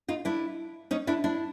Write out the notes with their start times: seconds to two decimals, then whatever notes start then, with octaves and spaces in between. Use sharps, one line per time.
0.08 D#4 F4
0.25 D4 E4
0.91 C#4 D#4
1.07 D4 E4
1.24 D4 E4